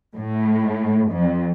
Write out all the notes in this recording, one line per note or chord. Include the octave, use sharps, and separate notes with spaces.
A2
F2